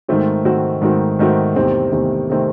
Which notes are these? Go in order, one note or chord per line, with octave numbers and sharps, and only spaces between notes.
G#2 D#3 A3 C4 F#4
G#2 D#3 A3 C4 F#4
G#2 D#3 A3 C4 F#4
G#2 D#3 A3 C4 F#4
E2 C3 D#3 A3 C4
E2 C3 D#3 A3 C4
C3 D#3 A3 C4